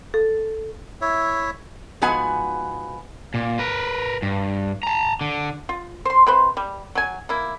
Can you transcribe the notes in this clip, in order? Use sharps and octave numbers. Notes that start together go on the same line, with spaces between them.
A4
E4 C#5 E5
G#2 F3 B3 F#4 F#5 G#5
A#2
A#4 B4
G2
A5 A#5
D3
F4
C5 C6
C3 B4 C5
G3
F#3 G#5
A#3 E4